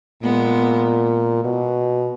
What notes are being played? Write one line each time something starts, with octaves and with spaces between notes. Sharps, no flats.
A#2 G#3 B3
B2